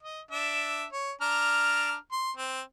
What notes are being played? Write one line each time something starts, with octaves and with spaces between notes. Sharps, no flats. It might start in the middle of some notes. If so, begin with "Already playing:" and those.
D#5
D4 E5
C#5
D4 A#5 F6
C6
C4